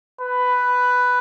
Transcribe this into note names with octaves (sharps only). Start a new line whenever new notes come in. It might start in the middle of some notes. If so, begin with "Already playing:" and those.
B4